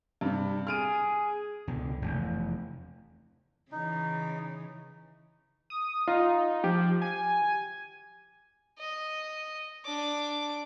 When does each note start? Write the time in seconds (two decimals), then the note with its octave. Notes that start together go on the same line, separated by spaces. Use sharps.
0.21 G2 C3
0.67 G#4 F6 D7 D#7
1.67 C#2 B2 D3
2.02 F1 E2
3.72 C#3 E3 D#4
5.70 D#6
6.08 D#4 F4
6.64 F3 G4
7.02 G#5
8.78 D#5
9.85 D4 D6